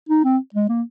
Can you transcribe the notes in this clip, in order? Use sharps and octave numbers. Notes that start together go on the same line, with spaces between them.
D#4
C4
G#3
A#3